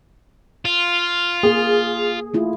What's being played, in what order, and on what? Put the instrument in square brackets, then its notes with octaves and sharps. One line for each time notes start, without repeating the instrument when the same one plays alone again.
[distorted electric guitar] F4
[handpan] A#3 [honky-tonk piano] G#4
[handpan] A3 E4 F4